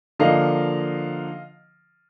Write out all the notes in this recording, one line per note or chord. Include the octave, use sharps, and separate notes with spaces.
D3 F3 A#3 D#5 F5